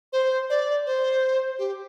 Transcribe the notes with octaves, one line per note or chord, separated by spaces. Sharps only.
C5
D5
C5
G4